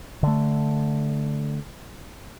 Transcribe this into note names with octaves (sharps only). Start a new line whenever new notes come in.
D3 A3